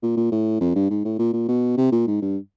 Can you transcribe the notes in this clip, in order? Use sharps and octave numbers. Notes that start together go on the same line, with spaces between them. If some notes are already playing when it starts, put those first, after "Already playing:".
A#2
A#2
A2
F2
G2
G#2
A2
A#2
A#2
B2
C3
A#2
G#2
G2